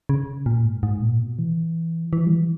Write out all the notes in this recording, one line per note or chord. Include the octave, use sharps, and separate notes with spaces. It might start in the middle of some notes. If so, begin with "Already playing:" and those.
C#3
A#2
G#2
G#2
A#2
B2
E3
E3
G3
E3